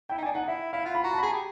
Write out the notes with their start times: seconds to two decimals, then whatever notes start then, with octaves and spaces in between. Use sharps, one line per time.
0.09 E4 G5
0.18 D#4
0.23 D4 G#5
0.32 D#4 F#5
0.48 E4 E5
0.73 E4 F5
0.84 F4 F#5
0.95 B5
1.03 F#4 A#5
1.13 A5
1.18 B5
1.22 G#4 A#5
1.33 G4